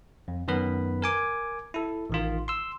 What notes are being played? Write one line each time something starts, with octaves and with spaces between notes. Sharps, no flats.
F2
F#2 D#3 B3 B4 B5
A#4 G#5 D6
E4 A4
A1 D#3 F4
C6 E6